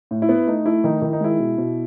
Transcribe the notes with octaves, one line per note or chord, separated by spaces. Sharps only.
A2
E4
B3
A3 D#4
A3 E4
D#3 D#4
D#3 E4
D#4
G#3 E4
B2
B2